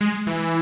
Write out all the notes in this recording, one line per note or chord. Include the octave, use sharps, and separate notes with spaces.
G#3
E3